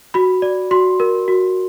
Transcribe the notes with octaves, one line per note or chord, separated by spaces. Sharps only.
F#4 B5
D5
F#4 C6
A#4
F#4